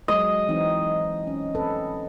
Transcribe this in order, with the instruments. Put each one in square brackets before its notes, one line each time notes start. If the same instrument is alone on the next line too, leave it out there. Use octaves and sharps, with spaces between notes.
[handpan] F#3 G#3 [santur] D#5
[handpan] E3 C4 D#4
C#4
C4 A4 B4